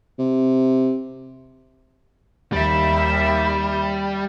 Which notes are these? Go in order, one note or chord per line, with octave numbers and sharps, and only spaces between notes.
C3
D#2 G3 E5